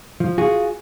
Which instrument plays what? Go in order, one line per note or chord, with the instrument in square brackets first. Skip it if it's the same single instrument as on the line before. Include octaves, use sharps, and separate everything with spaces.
[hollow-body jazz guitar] F3
F4 F#4 G#4